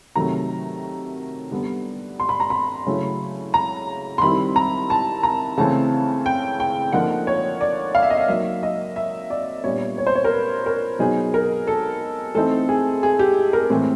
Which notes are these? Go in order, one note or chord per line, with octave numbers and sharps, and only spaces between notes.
C3 D#3 F#3 A3 A#5
D3 G3 B3
C6
B5
A#5
B5
C#3 F#3 A3 C#4 E4
A#5
C6
D#3 G3 C4 E4 B5
A#5
A5
A#5
C#3 E3 A3 C4 A5
G5
G5
D3 F3 A#3 D#4 F#5
C#5
D5
F5
E5
D#5
E5
F#3 A#3 D#4 E5
D#5
E5
D5
A#2 G3 B3 D4 C#5
C#5
C5
C#5
A#4
B4
A#4
B2 F#3 B3 D#4 G#4
A#4
A4
E3 A3 C4 D#4 A4
G#4
G#4
G4
A#4
A2 E3 G#3 C4